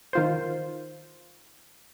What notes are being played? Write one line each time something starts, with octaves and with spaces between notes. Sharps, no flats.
D#3 F4 C5